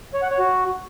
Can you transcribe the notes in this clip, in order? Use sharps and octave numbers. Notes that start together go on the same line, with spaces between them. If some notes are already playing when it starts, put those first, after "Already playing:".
C#5
F#5
C#5
F#4